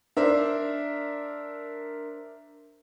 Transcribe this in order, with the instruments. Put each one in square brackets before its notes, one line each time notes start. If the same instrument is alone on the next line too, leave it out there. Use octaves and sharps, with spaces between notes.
[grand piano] D4 A#4 C5 E5